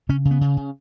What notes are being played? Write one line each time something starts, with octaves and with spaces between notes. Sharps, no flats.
C#3 C#4
C#3
B3
C#3
C#3